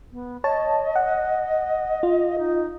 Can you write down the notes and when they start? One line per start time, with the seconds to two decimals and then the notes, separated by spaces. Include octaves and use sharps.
0.12 B3
0.44 C#5 D#5 A5
0.95 F#5
2.03 F4
2.39 D#4